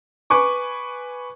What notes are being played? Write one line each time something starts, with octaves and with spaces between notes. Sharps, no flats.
B4 G#5 C#6 D6